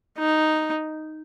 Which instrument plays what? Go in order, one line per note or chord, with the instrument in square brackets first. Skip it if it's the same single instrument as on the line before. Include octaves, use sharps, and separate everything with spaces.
[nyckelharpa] D#4